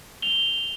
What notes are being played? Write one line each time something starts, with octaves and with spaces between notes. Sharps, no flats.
F7 G7